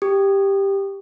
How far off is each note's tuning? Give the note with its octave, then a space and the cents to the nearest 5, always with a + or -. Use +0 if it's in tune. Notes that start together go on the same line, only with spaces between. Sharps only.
G4 +5 D#6 -30